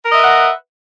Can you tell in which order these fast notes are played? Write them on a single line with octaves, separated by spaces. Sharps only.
A#4 D#5 E5 B4 F#5